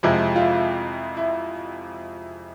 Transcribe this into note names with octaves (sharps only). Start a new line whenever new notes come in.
F2 C3 F3 G#3 E4
F4
E4
E4